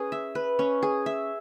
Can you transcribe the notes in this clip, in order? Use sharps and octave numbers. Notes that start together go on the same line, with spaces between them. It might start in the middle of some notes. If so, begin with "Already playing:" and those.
Already playing: C#4 G#4 B4
E5
B4
C#4
G#4
E5